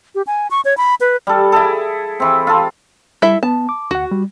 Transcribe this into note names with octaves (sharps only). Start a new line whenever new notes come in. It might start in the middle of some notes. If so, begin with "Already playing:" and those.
G4
G#5
C#6
C#5
B5
B4
G3 A4
E4 G#4 A4
E3 C4
F4 A4
G3 E4 A4 E5
B3 A5
D6
D2 F#4 F#5
G3